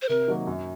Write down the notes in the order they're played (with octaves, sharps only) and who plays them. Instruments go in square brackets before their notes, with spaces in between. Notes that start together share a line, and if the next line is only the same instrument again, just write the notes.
[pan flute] C5
[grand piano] C3 [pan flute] A#4
[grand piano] D#3 F#3 A#3
F#2